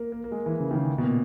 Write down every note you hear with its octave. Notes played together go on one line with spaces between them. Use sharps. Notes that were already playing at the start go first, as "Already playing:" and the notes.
Already playing: A#3
A#3
A#3
G#3
E3
C#3
D#3
C#3
B2
A#2